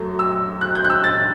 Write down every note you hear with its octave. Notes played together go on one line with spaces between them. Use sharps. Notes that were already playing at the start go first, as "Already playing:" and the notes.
Already playing: F#2 F#3 A3
E6
F#6
G6
F#6
E6
A6